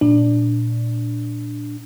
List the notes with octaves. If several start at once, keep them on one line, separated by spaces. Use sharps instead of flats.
A#2 D4